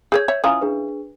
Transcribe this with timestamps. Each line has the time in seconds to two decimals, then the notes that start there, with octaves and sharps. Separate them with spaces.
0.12 G#4 A4 C#5 G6 G#6
0.28 C#5 E5
0.44 E3 C#4 F4 G#5 A#5 D#6
0.61 D4 G#4 B4